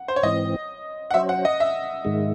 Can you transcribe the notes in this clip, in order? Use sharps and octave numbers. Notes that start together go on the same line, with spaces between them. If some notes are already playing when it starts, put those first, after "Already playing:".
Already playing: F#5
C5
C#5
G#2 E3 C4 D#5
F#5
F#3 C#4 F#4 C5 E5
F#5
D#5
E5
G#2 D#3 G#3